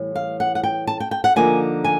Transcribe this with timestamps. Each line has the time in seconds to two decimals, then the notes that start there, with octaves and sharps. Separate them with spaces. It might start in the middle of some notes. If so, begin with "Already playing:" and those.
Already playing: A2 E3 G3
0.15 F5
0.40 F#5
0.55 F#5
0.64 G5
0.87 A5
1.00 G5
1.11 G5
1.24 F#5
1.36 D3 F3 A#3 D#4 G#5
1.84 G#5